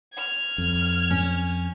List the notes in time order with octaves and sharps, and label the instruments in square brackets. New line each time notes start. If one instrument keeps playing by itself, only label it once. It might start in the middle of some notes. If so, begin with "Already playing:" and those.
[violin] F6 G#6
[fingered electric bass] F2
[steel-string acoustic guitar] C#4